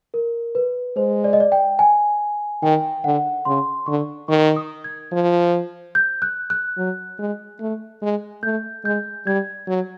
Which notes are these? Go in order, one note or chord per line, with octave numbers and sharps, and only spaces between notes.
A#4
B4
G#3 C5
D5
D#5
D5
G5
G#5
D#3 G5
D3 F#5
C#3 C6
D3 C#6
D#3 C#6
D#6
G#6
F3
G6
F#6
F#6
F#3
G#3
A3
G#3
A3 G6
G#3 G6
G3 G#6
F#3